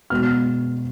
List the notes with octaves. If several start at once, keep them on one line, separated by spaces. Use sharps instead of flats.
B2 G#3 B3 F6